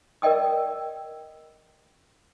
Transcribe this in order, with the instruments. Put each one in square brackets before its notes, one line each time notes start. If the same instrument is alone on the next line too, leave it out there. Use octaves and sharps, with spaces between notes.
[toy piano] A#4 D5 D#5 G5 D#6